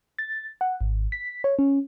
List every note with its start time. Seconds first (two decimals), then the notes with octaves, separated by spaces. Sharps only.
0.19 A6
0.61 F#5
0.81 G#1
1.12 B6
1.44 C#5
1.59 C#4